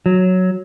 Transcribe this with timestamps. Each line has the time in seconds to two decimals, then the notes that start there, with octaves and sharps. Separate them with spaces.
0.06 F#3